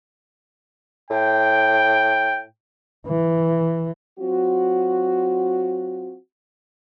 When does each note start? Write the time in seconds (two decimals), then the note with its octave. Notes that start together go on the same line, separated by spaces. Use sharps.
1.10 A2 G5
3.07 E3
4.19 F#3 C4 F4 F#4